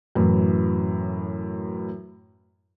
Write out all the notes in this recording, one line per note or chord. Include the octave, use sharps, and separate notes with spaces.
F#2 A2 E3